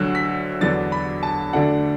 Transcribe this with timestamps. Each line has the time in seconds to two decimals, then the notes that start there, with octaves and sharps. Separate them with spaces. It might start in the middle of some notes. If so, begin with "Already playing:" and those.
Already playing: D2 D3 F#3 E6 F#6
0.15 B6
0.61 E2 D3 F#3 B3 D4 A6
0.92 B5
1.23 A5
1.53 D2 D3 A3 D4 F#5